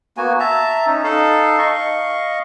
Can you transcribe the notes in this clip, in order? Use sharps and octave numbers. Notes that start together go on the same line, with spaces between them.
A#3 B3 F#4 G#5
E5 A5 A#5
C#4 D#4
D#4 A4 F5 A5
D#5 F5 C#6